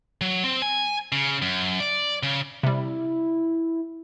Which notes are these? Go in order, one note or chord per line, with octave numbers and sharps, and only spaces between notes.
F#3
C4
G#5
C#3
F#2
D5
C#3
C3 G3 E4